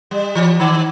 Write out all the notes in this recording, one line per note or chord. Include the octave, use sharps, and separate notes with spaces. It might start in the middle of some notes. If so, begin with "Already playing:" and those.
G3
E3
D#3